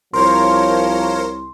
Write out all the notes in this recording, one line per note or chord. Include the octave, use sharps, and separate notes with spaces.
C2 F3 A#4 C5 C#5 C6